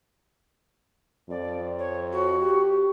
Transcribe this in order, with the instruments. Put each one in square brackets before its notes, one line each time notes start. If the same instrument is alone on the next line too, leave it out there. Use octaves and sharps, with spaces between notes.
[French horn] F2 [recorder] D5
[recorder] C#5
F#4
[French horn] G4